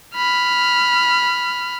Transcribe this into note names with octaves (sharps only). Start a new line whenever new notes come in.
B5 F6